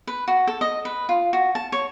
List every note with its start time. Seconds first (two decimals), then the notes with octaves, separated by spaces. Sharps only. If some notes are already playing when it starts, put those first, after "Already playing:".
0.07 B4
0.28 F#4
0.47 A4
0.61 D#5
0.85 B4
1.09 F4
1.33 F#4
1.55 A5
1.72 C#5